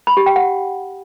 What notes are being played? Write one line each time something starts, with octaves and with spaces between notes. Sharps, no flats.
B5
G4
G5
F#5